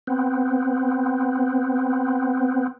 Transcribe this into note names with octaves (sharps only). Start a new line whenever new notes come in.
B3 C4